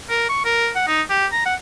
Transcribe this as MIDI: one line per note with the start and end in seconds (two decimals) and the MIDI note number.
0.10 0.26 70
0.29 0.44 85
0.44 0.70 70
0.75 0.87 78
0.87 1.02 63
1.10 1.27 67
1.32 1.44 82
1.46 1.55 78